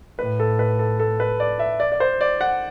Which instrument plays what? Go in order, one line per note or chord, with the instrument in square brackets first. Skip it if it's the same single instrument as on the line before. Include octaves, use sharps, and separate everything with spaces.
[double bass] A2 [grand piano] B4
[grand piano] A4
B4
A4
A4
B4
D5
E5
D5
D5
C5
D5
F#5